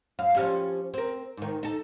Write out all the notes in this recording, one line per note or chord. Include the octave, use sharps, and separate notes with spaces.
F#2 F5
F3 G3 C#4
C4 A#4
G#2 D#3
D#4 A4